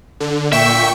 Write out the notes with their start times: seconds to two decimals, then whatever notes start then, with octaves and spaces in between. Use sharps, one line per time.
0.20 D3
0.52 A#2 E5 G5 C#6